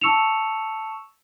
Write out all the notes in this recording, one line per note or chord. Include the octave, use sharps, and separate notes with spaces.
A5 C#6 E6 C#7 E7 F7